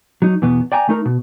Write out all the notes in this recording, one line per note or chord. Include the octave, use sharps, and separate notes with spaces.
F#3 D#4
E2 B2 B3
D5 G5 G#5 A#5
A3 D#4 A#4
B2